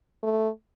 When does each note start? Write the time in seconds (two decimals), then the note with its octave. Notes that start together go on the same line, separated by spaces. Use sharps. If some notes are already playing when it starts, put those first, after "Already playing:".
0.23 A3